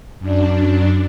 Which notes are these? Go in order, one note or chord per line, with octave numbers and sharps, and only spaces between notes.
F#2 D4